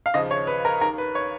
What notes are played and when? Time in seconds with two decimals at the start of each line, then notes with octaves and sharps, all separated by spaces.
0.06 F5
0.14 D#2 C#3 F3 D#5
0.31 C#5
0.47 B4
0.65 A#4
0.81 D#2 D#3 A#4
0.98 B4
1.15 C#5